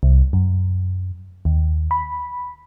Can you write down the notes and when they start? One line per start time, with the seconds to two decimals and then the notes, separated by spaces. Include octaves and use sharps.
0.03 C2
0.33 F#2
1.45 D#2
1.91 B5